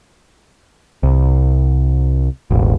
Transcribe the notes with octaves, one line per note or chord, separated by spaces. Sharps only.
C2
E1 A1